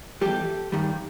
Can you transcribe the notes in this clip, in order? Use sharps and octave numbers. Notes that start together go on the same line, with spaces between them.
E2 B2 G3 G4 A4
G2 D#3 G3